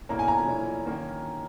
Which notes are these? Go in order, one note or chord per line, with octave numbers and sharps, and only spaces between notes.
B1 A#2 A#3 C#4 E4 A#5
G#5
A#5
G#5
B1 A#2 A#3 C#4 E4
D#3 A#3 C#4